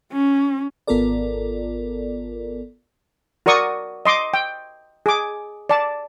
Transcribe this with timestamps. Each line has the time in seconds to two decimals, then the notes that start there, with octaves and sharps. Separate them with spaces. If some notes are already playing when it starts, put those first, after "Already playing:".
0.12 C#4
0.87 G#1 B3 F4 A4 A#4 D5
3.46 F#4 A#4 D5 C#6 D#6
4.05 D#5 C6 D6
4.34 G5
5.06 G#4 D6
5.69 D5 A5